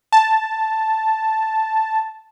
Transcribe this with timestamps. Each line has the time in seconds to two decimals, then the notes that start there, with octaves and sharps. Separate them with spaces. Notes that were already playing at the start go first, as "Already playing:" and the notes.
0.12 A5